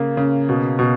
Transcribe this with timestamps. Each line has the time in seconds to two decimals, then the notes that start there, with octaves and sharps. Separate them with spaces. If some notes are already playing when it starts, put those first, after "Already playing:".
Already playing: C#3 A#3
0.17 C#3
0.49 B2
0.79 B2